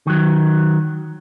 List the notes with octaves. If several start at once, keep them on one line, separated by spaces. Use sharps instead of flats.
D#3 F#3